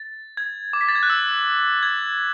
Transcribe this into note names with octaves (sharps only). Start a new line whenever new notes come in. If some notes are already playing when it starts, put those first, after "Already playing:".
Already playing: A6
G#6
D6
B6
A6
G#6
F#6
E6
G#6